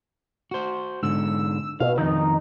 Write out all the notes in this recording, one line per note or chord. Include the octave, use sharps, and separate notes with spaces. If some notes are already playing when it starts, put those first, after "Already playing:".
F#4 C5
G#2 D3 E6
B2 F5
F2 D#3 D#4